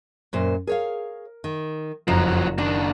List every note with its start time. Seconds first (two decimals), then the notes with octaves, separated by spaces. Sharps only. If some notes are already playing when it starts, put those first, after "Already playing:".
0.33 F#2 A#2 C5
0.67 G#4 A#4 C#5 F5
1.44 D#3
2.08 F#1 F2 F3 F#3 A#5
2.58 D#2 D#3 D4